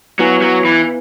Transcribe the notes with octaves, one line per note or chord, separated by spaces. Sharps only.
F#3 B3 E4 B4 G#5
F#3
E3